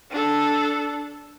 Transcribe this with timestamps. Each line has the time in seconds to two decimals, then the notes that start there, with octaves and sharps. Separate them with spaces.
0.11 D4 A4